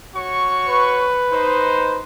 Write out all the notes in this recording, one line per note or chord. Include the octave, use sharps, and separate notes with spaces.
F#4 C#5 C#6
B4
D#4 C5